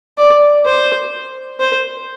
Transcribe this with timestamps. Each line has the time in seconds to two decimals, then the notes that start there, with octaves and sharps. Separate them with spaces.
0.18 D5
0.66 C5
1.60 C5